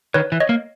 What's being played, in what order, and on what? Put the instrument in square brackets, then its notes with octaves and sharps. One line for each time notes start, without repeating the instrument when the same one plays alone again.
[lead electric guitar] D#3 [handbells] B4 C#5
[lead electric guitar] E3
[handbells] C#5 D#5
[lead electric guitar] A#3